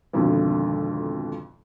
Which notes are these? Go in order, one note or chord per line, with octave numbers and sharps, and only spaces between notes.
G#1 F2 B2 D3